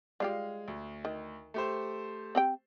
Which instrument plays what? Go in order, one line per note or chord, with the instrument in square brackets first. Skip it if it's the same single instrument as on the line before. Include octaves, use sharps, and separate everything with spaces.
[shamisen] G3 F4 G4 [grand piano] G#3 F5
[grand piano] D2
[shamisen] D#3
[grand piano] A3 G4 C5
[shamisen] C4 G4 G5